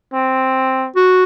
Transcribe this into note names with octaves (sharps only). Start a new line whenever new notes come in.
C4
F#4